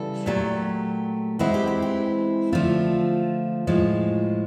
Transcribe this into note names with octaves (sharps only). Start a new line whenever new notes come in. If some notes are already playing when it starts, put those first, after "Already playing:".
Already playing: C#3 E3 G3 A4
A#2 F#3 A3 G4
E3 G#3 C4 E4 F#4
G4
G4
G4
D3 F3 A3 F4
A2 F3 G#3